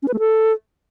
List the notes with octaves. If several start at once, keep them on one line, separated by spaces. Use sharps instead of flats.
C#4
B4
A3
A4